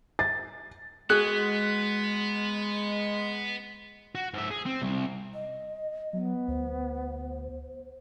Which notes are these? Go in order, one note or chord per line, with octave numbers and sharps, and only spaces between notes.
A6
G#3 B3 F#4 G#4 F#6
F#4
G#2 E5
G#4
C4
C2
D#5
F#3 B3
D2 C5